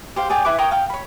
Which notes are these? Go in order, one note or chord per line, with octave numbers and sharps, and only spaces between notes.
G4 C5 F5
G#4 D5 G5
E4 B4 D6
A#4 C#5 G5 D#6
F5 G5
C#5 B5